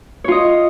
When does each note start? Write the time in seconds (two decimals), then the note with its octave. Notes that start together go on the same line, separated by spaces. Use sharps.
0.24 C#5
0.28 F4
0.32 D#5